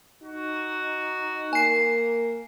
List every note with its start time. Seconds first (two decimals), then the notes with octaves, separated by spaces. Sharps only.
0.23 D#4 F#4
1.53 A#3 G#5 C7